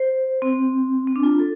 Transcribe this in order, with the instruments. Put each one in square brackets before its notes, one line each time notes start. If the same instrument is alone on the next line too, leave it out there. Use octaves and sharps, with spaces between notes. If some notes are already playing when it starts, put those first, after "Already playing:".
Already playing: [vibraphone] C5
C4
C4
D4
F4
A4